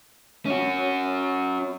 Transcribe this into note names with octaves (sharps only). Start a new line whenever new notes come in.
C#4 F#4